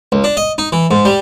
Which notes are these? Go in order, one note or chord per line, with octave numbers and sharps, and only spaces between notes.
C#2
D4
D#5
D#4
E3
G#2
G3